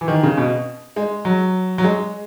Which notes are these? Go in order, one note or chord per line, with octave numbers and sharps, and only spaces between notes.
E3
D#3
C#3
B2
G#3
F#3
F#3
G#3